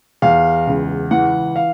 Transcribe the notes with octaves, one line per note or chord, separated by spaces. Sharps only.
E2 F5
C#2
E3 F#5
F5